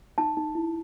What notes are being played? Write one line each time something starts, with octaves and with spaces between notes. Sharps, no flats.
D#4 A5
D#4
E4